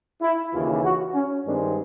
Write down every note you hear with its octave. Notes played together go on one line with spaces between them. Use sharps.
E4
D#2 C#3 E3 F4
F#4
C#4
G2 D#3 G#3 C4 D4